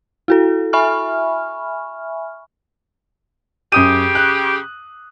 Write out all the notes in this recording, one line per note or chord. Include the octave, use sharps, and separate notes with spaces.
E4 F#4 A4
E5 G#5 B5 C#6 F6
F#2 C#3 G4 D#6 D#7
F#6